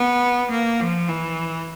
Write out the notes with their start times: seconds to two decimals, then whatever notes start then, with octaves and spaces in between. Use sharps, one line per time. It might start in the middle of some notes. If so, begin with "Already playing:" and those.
Already playing: B3
0.51 A#3
0.80 F3
1.09 E3